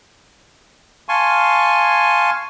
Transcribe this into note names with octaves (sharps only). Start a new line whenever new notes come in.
F5 G#5 A5 C6 C#6